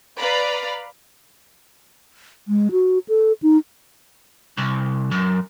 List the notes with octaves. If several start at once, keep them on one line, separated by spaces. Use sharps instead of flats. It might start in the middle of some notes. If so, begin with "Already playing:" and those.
B4 D5 F5 A#5 B5
G#3
F#4
A4
D#4
C2
F#2